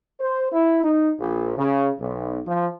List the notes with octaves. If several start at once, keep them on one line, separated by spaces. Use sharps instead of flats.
C5
E4
D#4
A#1
C#3
B1
F3